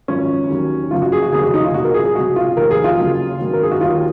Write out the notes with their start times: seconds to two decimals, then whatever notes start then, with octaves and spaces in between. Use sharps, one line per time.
0.08 G#1 F#2 F3 C#4
0.50 D#2 D#3 F#3
0.91 F#1 F#2 F3 F4
1.02 F#4
1.12 G#4
1.22 F#4
1.32 F1 D#2 C#3 F#3 G#4
1.43 F#4
1.54 D#4
1.64 F4
1.74 C2 A#2 F3 F#4
1.84 A#4
1.94 G#4
2.05 G#4
2.15 C#2 C3 F#3 F#4
2.36 F4
2.57 F1 D#2 D#3 A#4
2.71 G#4
2.84 F4
2.98 F#1 F#2 C#3 F#3
3.40 G#1 F#2 D#3 F#3
3.53 A#4
3.63 G#4
3.71 F#4
3.81 D#2 D#3 F#3 F4